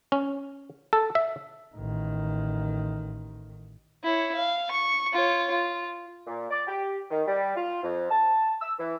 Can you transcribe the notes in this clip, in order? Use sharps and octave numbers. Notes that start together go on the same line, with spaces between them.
C#4
A4
E5
A1 D#3
E4 C#5
F5
C#6
F4 C#5
F4
A#2
D5
G4
D#3
G3
F4
F2
A5
E6
E3